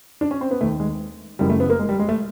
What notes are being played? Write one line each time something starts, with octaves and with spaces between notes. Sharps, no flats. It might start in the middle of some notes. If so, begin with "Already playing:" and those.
D4
C#4
C4
B3
D#2 D#3 A3
G#3
F#1 F#2 C#3 E3 G3
A3
B3
A#3
G#3
G3
G#3
A3